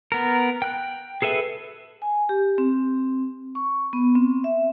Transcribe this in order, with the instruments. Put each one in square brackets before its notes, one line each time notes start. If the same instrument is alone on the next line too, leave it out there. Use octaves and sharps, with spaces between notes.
[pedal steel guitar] B3 A#4
G5 F#6
G#4 A4 B4 E5
[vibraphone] G#5
G4
C4
C#6
B3
C4
E5